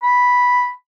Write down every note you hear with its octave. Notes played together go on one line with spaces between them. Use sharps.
B5